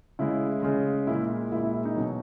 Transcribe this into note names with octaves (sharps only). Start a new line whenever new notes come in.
C#3 G#3 E4
C#3 G#3
A#2 G#3 E4
A#2 G#3 E4
E4
E4
D#4
B2 F#3